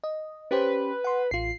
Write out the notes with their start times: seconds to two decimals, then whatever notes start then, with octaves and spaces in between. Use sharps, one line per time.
0.04 D#5
0.51 C#4 G4 B4 C5
1.04 F#5 C6
1.31 A1 F4 C7